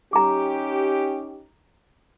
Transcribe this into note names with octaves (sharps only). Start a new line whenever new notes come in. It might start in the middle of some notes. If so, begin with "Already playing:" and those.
C#4 D#4 G4 A#5 D6